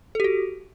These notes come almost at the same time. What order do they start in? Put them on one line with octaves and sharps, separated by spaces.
A4 G4 F#4